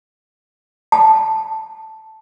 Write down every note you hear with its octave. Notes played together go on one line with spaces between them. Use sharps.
A5